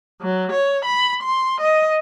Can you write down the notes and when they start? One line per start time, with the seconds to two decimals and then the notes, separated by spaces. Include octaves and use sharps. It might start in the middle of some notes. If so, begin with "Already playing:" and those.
0.21 F#3
0.51 C#5
0.85 B5
1.21 C6
1.60 D#5